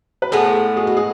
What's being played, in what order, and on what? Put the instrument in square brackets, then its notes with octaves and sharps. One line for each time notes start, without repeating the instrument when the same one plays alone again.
[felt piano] B4
[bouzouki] A2 G#3 B3 [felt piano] A4
[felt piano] G#4
F#4
G#4